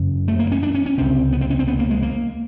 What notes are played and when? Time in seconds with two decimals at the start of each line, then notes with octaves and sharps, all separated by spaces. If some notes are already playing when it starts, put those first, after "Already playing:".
Already playing: F#2 C#3
0.28 A3
0.39 A#3
0.52 C#4
0.63 D4
0.75 C#4
0.86 C#4
0.98 C#2 C3 C4
1.33 B3
1.41 C4
1.50 C#4
1.59 C4
1.68 B3
1.79 A#3
1.91 G#3
2.03 A#3